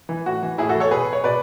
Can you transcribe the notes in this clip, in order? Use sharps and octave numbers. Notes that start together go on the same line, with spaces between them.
E3
A2 F#4
E3
A2 E4 G#4
F#4 A4
E3
A4 C#5
B2 G#4 B4
C#5
B2 B4 D5